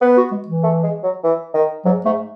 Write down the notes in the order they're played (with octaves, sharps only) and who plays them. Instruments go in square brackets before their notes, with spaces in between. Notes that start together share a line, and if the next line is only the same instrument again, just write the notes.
[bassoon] B3 [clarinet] B4
[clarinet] F#4
G#3
E3
[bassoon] A3
G#3
F#3
E3
D#3
[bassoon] G#2 [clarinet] F#3
[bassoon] G#2 [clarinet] A3